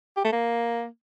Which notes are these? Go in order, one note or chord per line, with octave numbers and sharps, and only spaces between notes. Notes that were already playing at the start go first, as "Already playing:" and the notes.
G4
A3
A#3